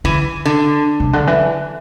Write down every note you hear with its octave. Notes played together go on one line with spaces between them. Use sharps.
D3 E3
D3
C3
D3
E3